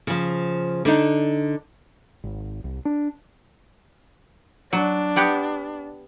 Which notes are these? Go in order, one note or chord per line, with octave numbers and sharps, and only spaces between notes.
C#3 F3
D3 D4 D#4
G#1
C2
D4
F#3 D4
B3 G4 F#5